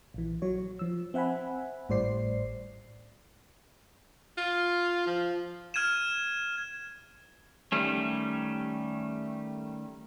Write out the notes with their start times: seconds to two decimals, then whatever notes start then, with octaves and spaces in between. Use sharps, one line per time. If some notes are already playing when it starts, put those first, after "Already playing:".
0.14 A#1 E3
0.42 F#3 C#5
0.79 F3 E6
1.14 C4 E5 F#5 G#5 B5
1.89 G#1 A2 G3 C5 D5 C7
4.38 F4
5.06 F3
5.74 F6 G#6 D#7 E7
7.72 D#3 G3 A3 C#4